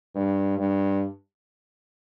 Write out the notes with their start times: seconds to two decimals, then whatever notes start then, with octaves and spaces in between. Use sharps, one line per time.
0.15 G2
0.58 G2